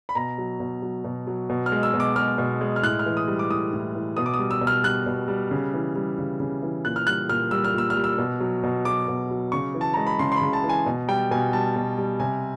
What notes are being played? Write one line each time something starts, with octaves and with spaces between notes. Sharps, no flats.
B5
B2 A#5
F#3
B2
F#3
B2
F#3
B2
F6
G#3
E6
B2
D6
G#3 F6
B2
G#3
F6
A2 F#6
F6
E3
D#6
G3
D6
A2 D#6
A2
E3
B2 D#6
D6
D#6
G3
E6
B2
F6
G3 F#6
B2
G3
C#3
E3
G3
C#3
C#3
E3
A#2 F#6
F6
G3 F#6
A#2 F6
G3 E6
F6
A#2 E6
F6
G3
E6
B2
F#3
B2
F#3 D6
B2
F#3
C#3 C#6
E3
A5
G#3 A#5
B5
C#3 C6
C6
B5
C#3
A5
E3
G#5
B2
G3 G5
B2 G#5
G3 A5
B2
G3
C3 G#5